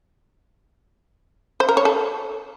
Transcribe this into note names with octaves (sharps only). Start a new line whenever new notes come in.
C5
A#4
C#5
A4